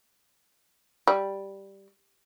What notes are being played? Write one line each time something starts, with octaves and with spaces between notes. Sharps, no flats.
G3